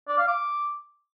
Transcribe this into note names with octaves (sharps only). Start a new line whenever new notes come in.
D5
F5
D6